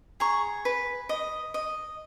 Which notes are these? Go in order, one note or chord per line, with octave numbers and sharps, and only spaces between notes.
G#4 A#5 C#6
B4
D#5
D#5